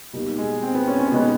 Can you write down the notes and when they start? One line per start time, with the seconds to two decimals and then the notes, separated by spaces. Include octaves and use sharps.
0.13 B2 G3 A#3 D#4
0.38 G#3
0.63 C4
0.75 B3
0.88 C#4
0.99 C#4
1.12 B2 G#3 B3 D#4